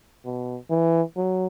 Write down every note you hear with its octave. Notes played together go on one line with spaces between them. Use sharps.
B2
E3
F#3